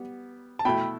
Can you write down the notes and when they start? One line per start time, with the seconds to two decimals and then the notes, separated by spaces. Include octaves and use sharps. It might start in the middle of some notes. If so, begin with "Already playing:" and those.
Already playing: G3 B3
0.59 A5
0.65 B2 A3 E4 G5 B5